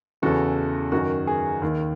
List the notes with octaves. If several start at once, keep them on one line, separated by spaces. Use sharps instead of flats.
E2 C#3 E3 F#4 A4
F#2 D#3 F#4
G#4
D#2 D#3